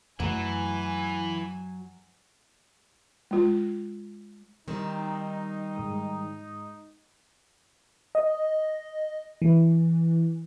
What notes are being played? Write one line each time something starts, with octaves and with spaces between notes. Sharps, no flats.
F#2 E3 F#3 A3 G#5
G#3 F4
D#3 G3 C4 D#4
G#2 G#3 D#6
D#5
E3